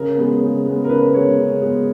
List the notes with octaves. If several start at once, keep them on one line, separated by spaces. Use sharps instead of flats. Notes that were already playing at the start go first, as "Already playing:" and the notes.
Already playing: C#3 A#4
G#3 B3
C#3
G#3 B3
A#4
C#3 B4
G#3 B3 C#5
C#3
G#3 B3